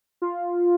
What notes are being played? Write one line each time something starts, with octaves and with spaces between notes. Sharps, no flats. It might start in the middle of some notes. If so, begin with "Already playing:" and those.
F4